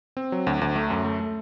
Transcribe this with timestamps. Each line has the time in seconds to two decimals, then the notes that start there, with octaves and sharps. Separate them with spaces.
0.17 C4
0.32 F#3
0.47 D2
0.61 D2
0.76 A3
0.90 F#2
1.05 A3
1.20 A3